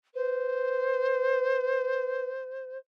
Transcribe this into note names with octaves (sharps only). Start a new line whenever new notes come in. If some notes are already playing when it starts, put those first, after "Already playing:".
B4 C5